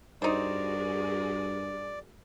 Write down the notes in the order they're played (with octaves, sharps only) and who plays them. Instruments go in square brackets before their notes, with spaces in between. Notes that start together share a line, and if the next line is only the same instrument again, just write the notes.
[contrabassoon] G2 [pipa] D#4 C5 [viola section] F#4 G#4 A#4 [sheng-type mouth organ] D5